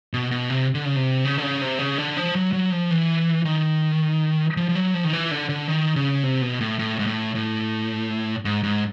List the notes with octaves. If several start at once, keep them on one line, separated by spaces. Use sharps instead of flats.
B2
B2
C3
D3
C#3
C3
C#3
D3
C#3
C3
C#3
D3
F3
F#3
F#3
F3
E3
D#3
F3
F3
F#3
F3
D#3
E3
D3
D3
D#3
C#3
C3
B2
A2
A2
G#2
A2
A2
G#2
G#2